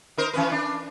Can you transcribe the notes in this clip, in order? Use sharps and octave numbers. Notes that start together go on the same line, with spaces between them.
D#4 A#4 C5
E3 C#4 B4
D4